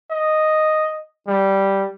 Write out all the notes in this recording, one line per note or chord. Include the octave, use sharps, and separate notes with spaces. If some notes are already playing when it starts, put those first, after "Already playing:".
D#5
G3